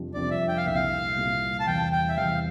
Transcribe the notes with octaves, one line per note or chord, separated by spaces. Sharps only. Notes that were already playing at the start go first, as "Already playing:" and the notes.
Already playing: F2 C3 G3 D4 F4
F2 C3 G3 D4 F4 D5
E5
G5
F5
C2 A#2 G3 E5
F5
C2 A#2 G3
A5
E2 C3 G3 G5
G5
E5
E2 C3 G3 F5